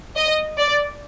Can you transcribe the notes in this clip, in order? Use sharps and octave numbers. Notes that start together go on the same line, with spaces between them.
D#5
D5